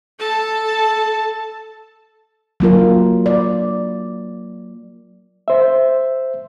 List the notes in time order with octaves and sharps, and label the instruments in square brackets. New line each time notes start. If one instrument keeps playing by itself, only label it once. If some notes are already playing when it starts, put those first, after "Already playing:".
[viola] A4 A5
[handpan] F#3 A#3 F4 A#4
D5
[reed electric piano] C5 E5